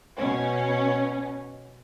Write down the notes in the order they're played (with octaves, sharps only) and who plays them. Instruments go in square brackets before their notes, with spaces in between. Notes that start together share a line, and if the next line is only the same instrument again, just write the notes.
[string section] B2 C#4